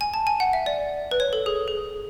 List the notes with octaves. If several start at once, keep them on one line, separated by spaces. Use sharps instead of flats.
G#5
A5
G#5
F#5
E5
D5
B4
C#5
A4
G#4
G#4